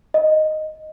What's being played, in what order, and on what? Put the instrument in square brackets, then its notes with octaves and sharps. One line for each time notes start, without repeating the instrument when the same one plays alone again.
[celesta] D#5